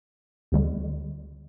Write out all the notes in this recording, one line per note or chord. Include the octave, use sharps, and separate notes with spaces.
D2 D3 G3